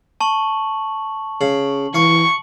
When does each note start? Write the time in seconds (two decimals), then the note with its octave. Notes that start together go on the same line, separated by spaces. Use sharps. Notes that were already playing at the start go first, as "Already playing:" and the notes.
0.21 A5 C#6 F#7
1.41 C#3 F#7
1.95 E3 F5 C#6